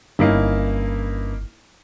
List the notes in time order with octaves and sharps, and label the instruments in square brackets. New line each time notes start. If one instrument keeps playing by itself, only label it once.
[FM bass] G1 [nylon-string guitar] G2 C#4 [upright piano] A#3 D#4 E4